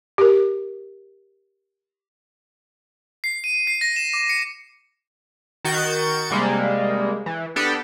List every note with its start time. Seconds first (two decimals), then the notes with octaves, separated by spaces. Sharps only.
0.18 G4 A#4
3.24 C7
3.44 D#7
3.67 C7
3.81 A#6
3.96 E7
4.14 D6
4.29 C#7
5.65 D#3 F#4 G6 A6 C#7
6.31 C3 G3 G#3 A#3
7.26 E3
7.56 B3 D4 G4 A4